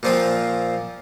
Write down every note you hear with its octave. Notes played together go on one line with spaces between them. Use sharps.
A#2 F3 C4 F4